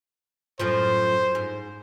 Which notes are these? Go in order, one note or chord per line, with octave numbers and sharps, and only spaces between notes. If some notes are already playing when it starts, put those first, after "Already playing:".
F#2 A2 F3 C5
G#2